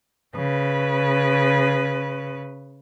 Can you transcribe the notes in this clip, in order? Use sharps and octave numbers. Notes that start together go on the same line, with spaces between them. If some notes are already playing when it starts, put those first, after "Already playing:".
C#3 B4